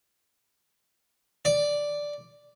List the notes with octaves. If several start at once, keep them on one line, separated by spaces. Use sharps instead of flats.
D5